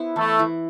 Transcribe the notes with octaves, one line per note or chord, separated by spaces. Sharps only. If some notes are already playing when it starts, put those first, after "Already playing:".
Already playing: B3 E4 C5
E3 A3 A4
E3